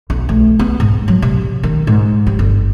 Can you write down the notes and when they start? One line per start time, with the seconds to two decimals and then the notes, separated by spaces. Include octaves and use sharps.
0.10 B1
0.29 A3
0.59 B3
0.80 G#2
1.08 F#3
1.22 C3
1.63 D#3
1.87 G#2
2.26 G3
2.39 G1